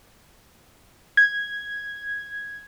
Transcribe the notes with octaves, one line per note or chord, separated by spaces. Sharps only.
G#6